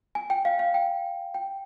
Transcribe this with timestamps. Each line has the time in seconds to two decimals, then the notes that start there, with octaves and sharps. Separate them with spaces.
0.15 G#5
0.30 G5
0.45 F5
0.59 F5
0.74 G5
1.34 G5